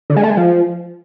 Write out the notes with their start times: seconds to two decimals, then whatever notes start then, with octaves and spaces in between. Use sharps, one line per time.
0.10 D3
0.17 G#3
0.23 A3
0.30 G#3
0.37 F3